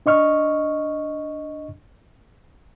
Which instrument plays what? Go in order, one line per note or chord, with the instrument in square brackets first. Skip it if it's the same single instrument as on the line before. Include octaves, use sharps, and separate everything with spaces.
[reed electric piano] D4 D#5 C#6 F6